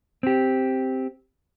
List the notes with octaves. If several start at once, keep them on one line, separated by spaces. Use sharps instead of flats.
C4 G4